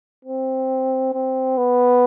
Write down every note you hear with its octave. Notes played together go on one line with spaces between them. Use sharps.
C4
C4
B3